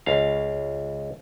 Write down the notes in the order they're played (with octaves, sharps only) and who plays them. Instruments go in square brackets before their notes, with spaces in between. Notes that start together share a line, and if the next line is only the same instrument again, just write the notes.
[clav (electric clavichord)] C#2 F5